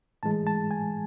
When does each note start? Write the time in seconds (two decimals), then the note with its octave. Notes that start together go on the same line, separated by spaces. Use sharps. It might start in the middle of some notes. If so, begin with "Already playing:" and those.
0.23 A2 E3 G#3 A5
0.47 A5
0.71 G#5